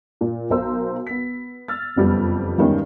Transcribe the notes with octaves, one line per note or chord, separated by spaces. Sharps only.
A#2
B1 A#4 C5 E6
B3 B6
E6 F6 A6
F#1 F2 G3 B3
E2 G2 D#3 G3 G#3 C#4